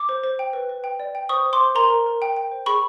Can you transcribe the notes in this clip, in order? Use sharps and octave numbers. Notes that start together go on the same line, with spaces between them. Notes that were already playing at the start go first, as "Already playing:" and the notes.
Already playing: D6
C5
C5
G5
B4
B4
G5
D5
G5
C5 C#6 D#6
C5
C6 D6
C5
A#4 A#5 C6
A#4
A#4
G5
G5
C5
G#4 B5 C#6